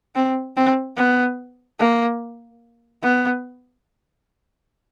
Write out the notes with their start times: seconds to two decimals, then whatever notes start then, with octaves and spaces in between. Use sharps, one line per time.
0.16 C4
0.57 C4
0.97 B3
1.79 A#3
3.03 B3